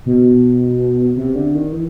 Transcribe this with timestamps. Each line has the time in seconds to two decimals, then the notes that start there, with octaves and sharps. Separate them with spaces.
0.06 B2
1.16 C3
1.35 D3
1.55 D#3
1.73 E3